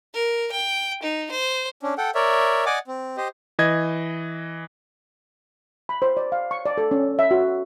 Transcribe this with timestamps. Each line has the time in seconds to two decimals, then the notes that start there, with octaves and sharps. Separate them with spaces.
0.14 A#4
0.52 G5
1.03 D#4
1.31 C5
1.83 C#4 D4
1.98 A4 F#5 G5
2.15 A#4 C#5 D5 E5
2.66 D5 D#5 F#5 G#5 D6
2.87 C4
3.17 G4 C5 D#5
3.59 E3 D#5 G#6
5.89 B5
6.02 C5
6.17 D5
6.32 F5
6.51 C#6
6.65 D5
6.78 A4
6.91 C#4
7.19 E5
7.31 F#4